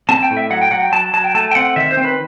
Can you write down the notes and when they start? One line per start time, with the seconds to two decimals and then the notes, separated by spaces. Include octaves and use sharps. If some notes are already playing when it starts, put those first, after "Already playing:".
0.09 C4 A5
0.23 G5
0.30 A2
0.37 E5
0.50 F#3 F#5
0.62 G5
0.71 F#3 F#5
0.82 G5
0.92 F#3 A5
1.13 F#3 A5
1.24 G5
1.34 A3 A5
1.51 G5
1.55 C4 F#5
1.76 D#3 E5
1.91 C5
1.97 C4
2.04 B4